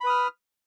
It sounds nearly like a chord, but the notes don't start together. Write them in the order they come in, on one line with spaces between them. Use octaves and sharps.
B5 B4 D#6 F6